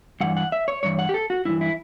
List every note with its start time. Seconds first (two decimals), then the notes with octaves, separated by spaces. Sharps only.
0.21 G2 E3 F#5
0.37 F#5
0.52 E5
0.68 C#5
0.83 G2 E3 C#5
0.99 F#5
1.09 G4
1.14 A4
1.30 F#4
1.45 G2 E3 E4
1.61 E4